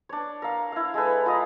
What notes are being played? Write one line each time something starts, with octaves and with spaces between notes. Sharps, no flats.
D4 C#5
A#4 F5
E4 F5
G#3 A4 B4
F4 D#5 A#5